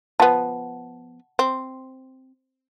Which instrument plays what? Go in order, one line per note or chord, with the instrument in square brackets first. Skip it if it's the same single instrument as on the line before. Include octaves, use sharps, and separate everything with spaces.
[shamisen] F3 B3 [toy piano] F#5 A5
[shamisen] C4